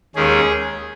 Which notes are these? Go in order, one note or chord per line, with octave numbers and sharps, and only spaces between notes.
D#2 D#3 G#3 C#4 G#4